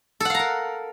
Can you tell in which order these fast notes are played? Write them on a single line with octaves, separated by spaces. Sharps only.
A4 F#5 F5 A#5 A#4